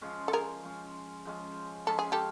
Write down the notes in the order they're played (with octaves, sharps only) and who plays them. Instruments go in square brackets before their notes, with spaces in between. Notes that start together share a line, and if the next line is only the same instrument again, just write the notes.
[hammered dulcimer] F3 G#3 C#4
[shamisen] A4
G#4 A#4
[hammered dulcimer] F3 G#3 C#4
F3 G#3 C#4
[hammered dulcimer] F3 G#3 C#4 [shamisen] A4
[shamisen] G#4
G4 A4